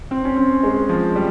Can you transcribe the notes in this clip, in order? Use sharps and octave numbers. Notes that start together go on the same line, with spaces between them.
C4
C#4
C4
G#3
F3
G3